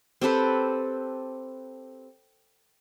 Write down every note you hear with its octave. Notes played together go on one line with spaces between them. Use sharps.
C4 G4 A4 B4